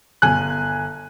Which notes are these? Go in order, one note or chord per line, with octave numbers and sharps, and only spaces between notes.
G1 G#5 F#6